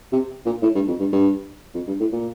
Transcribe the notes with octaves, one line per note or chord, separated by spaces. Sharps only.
C3
A#2
A2
G2
F2
G2
G2
F2
G2
A2
A#2